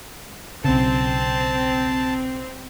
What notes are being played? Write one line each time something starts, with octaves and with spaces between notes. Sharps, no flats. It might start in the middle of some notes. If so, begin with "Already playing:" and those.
B1 C#3 C4 A5